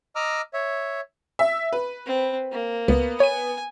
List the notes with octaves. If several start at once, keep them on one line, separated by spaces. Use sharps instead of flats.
D#5 A#5 D6 E6 F6
C#5 E5
E5
B4
C4
A#3
C#2 B3
C#5 G#5 D#7